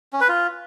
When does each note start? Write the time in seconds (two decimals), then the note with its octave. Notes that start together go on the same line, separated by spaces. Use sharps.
0.13 C#4
0.21 B4
0.28 F4